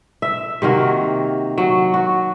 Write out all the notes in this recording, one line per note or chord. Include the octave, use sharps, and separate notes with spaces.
E5
C3 D#3 A#3 F#4
F#3
F#4